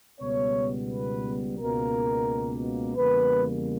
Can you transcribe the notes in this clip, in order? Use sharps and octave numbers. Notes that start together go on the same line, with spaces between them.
C#2 B2 G3 B3 C#5
B4
C#2 B2 A#3 A#4
E2 C#3 G3 A#3 B4